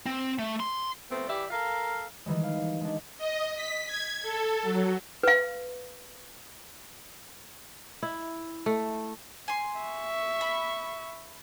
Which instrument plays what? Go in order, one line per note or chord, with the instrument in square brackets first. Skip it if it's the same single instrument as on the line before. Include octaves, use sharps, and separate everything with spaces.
[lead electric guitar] C4
A3
C6
[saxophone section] F3 A3 B3 C4
E3 G4 D5 E5
A4 A#4 F5
[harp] D#3 E3 G3 G#3
F5
G#3 D4
[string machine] D#5
B6
G#6
A4
F#3
[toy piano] B4 F5
[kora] E4
A3
[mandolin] G#5 C6
[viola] E5 C#6
[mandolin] B5